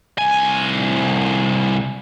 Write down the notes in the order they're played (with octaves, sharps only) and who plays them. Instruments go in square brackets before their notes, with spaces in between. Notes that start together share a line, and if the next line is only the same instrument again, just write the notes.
[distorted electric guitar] C2 G#5